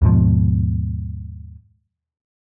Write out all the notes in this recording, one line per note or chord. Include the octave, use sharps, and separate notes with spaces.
D#2 G#2 B2 F3